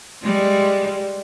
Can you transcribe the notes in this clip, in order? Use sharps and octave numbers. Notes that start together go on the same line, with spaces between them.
G3 G#3